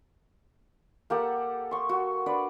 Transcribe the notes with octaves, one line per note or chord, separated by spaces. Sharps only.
A#3 G4 A4 F#5
C6 C#6
F#4
D4 B4 D5